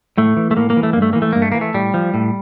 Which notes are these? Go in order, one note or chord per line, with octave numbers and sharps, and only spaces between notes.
A2 A3
E3
A3
A2 A#3
A#3
E3
A3
G2 A#3
A3
E3 A#3
A3
G2 A#3
A3
E3 A#3
A3
A2 G3
F3
A2